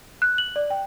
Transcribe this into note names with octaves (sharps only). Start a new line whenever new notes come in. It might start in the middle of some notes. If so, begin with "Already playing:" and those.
F#6
F#7
D5
G5